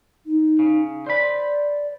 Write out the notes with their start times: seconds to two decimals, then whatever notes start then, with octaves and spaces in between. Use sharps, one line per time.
0.26 D#4
0.59 C#3
1.06 C5 D5 B5